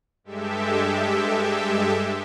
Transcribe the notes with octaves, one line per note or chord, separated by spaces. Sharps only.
G2 G#3 G4 A4 E5